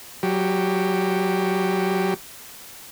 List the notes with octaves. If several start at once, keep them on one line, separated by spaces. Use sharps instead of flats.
F#3 G4